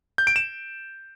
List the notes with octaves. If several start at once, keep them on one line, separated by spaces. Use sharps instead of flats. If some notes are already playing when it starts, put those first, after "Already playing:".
G6
D7
E7